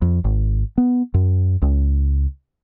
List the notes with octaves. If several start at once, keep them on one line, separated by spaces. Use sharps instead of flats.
F2
G#1
B3
F#2
C#2